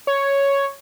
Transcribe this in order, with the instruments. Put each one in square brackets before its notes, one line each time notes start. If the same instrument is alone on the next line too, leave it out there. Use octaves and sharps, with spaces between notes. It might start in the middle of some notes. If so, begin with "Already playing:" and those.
[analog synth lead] C#5